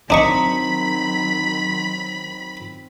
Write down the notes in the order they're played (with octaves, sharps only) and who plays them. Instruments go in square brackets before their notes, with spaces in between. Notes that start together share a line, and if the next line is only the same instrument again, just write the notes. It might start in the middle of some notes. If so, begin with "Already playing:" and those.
[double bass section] D#3 F#3 [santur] C4 A#5 [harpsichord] D4 D#5 C#6 [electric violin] B5